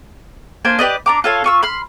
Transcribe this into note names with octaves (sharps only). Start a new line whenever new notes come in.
A#3 D4 C5 G#5
G4 B4 D5 D#5
D4 A#5 D6
F4 A4 C#5 F5
F4 C#6 E6
B5 C6 F6